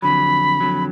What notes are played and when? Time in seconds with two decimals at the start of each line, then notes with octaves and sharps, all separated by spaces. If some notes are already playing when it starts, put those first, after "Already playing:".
0.02 F2 D3 F#3 B5
0.60 F2 D3 F#3